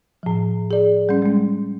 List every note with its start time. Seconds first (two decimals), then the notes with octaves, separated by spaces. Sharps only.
0.23 A2 F3
0.71 G#4 D5
1.09 G3 C#4
1.22 G#3 C#4